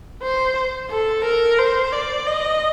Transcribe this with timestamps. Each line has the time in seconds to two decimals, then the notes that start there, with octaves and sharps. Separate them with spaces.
0.22 C5
0.90 A4
1.24 A#4
1.58 C5
1.92 D5
2.27 D#5